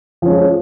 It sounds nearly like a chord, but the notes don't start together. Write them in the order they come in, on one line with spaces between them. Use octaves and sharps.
F3 C#4 G#3